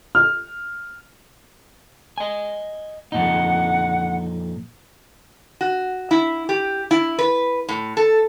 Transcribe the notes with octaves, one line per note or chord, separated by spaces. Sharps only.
F6
D#5 G#5
F2 A#2 D#4 F#5
F#4
E4
G4
E4
B4
A2
A4